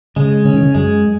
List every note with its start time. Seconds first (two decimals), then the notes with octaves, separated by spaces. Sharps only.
0.16 C#3 G#3
0.45 C#3 C#4
0.54 D#3
0.63 C#3
0.75 F#2 G#3